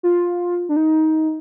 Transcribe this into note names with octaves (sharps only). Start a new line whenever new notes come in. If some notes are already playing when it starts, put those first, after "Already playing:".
F4
D4
D#4